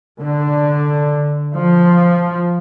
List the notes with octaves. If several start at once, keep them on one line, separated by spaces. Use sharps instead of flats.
D3
F3